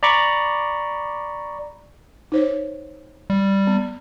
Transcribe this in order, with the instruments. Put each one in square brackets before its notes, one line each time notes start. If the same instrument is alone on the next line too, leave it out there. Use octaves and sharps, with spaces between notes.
[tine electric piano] D5 A#5 B5 C#6 D6
[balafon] D#4 C5 C#5
[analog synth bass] G3
[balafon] B3